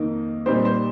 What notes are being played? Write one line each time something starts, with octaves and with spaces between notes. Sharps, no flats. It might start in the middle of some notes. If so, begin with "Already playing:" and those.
Already playing: F2 D#3 A#3 D#4
A#2 G3 C4 D#4 C5
C5